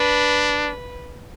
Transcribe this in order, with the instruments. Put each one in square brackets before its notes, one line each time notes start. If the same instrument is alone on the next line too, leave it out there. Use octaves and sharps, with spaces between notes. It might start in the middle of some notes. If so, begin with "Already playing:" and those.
Already playing: [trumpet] D4 [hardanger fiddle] B4